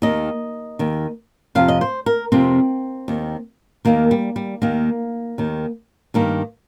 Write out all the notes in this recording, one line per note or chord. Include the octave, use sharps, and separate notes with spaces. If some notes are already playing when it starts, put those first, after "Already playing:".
D#2 D#3 D#5
D#2 D#3
F2 C3 F3 F5
D#5
C5
A#4
F2 C3 F3 C4
D#2 D#3
D#2 D#3 A#3
G3
G3
D#2 D#3 A#3
D#2 D#3
G2 D#3 A#3